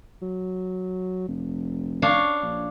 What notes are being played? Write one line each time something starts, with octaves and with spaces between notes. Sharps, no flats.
F#3
F1
D4 C#5 F5
A#1